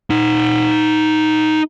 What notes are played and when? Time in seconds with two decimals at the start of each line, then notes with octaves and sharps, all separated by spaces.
0.10 D#4 F#5